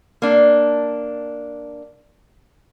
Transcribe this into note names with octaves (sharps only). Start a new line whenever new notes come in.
A#3 D4